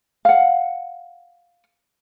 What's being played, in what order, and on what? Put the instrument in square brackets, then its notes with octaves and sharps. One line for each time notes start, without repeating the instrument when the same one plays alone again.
[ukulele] F5 F#5